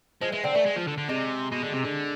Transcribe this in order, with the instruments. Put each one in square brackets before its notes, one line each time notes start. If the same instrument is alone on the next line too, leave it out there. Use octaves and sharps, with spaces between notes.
[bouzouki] F3 [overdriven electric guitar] G#3
[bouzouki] E3 [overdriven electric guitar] G#3
[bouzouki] D3 [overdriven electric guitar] C4
[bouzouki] E3 [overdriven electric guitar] A3
[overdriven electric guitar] G#3
F3
D3
D3
[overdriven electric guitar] C3 [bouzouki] G#3
[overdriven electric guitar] B2
D3
C3
D3